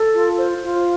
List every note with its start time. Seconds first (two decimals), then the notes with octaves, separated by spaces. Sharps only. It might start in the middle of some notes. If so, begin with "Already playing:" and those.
Already playing: A4
0.13 F4
0.38 C5
0.62 F4